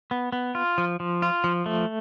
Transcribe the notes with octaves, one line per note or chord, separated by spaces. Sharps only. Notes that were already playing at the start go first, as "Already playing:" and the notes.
B3
B3
F4
F3
F3
F4
F3
A3